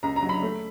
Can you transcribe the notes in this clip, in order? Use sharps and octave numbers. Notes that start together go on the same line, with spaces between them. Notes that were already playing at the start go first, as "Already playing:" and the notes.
C#2 A#5
A#5
F#3
B5
A3